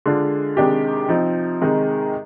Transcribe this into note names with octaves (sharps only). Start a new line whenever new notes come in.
D3 G#3 D4 F4
C3 D#3 G#3 D4 G4
C3 F3 C4 D#4
C3 D#3 G#3 D#4